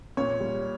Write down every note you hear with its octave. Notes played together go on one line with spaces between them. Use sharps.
A#2 C#5
G3